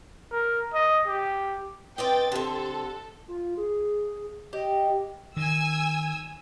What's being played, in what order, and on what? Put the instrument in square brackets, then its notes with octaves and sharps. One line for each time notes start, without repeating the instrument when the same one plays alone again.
[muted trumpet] A#4
D#5
G4
[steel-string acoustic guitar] C4 D5 D#5 [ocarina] B4 [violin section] G5 A6
[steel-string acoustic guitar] D3 C4 [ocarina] G4 [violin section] A4
[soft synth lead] F4
G#4
[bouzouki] G4 [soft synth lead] D#5
[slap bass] D#3 [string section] G#5 E6